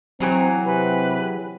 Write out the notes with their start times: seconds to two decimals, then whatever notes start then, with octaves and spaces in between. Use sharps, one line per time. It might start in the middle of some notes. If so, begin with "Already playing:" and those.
0.20 E3 F#3 C4 G#4 A#5
0.65 C3 B4